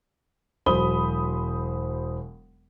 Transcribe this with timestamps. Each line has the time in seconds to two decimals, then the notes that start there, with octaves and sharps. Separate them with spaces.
0.66 E1 F#3 C5 B5 D#6 G7